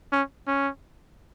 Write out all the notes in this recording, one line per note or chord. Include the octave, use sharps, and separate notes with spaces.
C#4
C#4